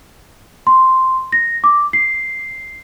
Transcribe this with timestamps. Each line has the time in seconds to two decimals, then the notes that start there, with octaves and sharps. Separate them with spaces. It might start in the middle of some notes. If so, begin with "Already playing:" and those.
0.67 C6
1.32 A#6
1.64 D6
1.93 C7